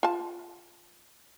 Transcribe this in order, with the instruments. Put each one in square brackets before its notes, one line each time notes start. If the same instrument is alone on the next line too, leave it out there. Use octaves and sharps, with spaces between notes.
[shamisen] F4 A5